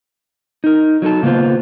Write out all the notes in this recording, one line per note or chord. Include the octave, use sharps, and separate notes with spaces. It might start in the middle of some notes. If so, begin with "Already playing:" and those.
D#4 A#4
F#3 D#4 A4 A5
C#3 A#3 B3 F4 C5